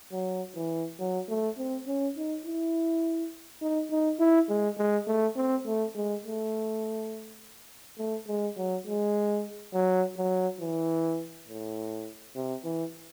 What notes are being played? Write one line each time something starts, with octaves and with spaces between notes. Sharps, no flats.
F#3
E3
F#3
A3
C4
C#4
D#4
E4
D#4
D#4
E4
G#3
G#3
A3
C4
A3
G#3
A3
A3
G#3
F#3
G#3
F#3
F#3
E3
A2
C3
E3